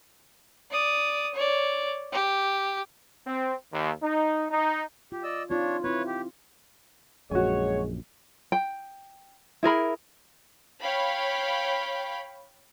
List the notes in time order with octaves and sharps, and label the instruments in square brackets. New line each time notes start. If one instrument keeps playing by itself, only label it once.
[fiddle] D5 D#6
C#5 D5
G4
[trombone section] C4
D#2
D#4
D#4
[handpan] F4 [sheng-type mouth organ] G4
[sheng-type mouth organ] D5 D#5 E6
[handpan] C4 D#4 F4 [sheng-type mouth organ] D4 C#5
[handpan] C4 E4 [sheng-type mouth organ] B4 C#5
[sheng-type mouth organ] G4
[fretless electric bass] A#1 F#2 [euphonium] G#3 [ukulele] F#4 G#5 [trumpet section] C#5
[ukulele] G5
E4 G#4 A#4 B5
[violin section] C#5 F5 G5 B5